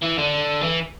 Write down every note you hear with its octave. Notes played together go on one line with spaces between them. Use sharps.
E3
D3
E3